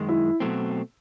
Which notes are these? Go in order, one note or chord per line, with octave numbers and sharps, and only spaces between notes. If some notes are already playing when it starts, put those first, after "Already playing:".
Already playing: F#2 D#3 G#3
E4
B2 F#3 A3 C4